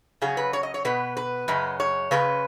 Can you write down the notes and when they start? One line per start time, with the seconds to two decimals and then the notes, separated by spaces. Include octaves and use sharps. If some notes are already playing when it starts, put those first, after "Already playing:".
0.22 C#3 F#3 C#4 G#4
0.37 B4
0.53 C#5
0.63 D#5
0.74 C#5
0.85 B2 B3 B4
1.17 B4
1.48 F#2 C#3 G#3 C#4
1.80 C#5
2.11 C#3 G#3 C#4 B4